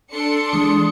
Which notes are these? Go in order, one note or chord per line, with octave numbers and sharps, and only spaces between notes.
D4 A4 C6 C#7
E3 G#3 D#6